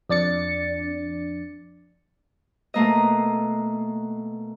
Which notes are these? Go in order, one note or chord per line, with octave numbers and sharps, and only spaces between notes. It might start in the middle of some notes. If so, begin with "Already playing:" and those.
F2 D4 D5 A6 C#7
B2 A3 A#3 D#5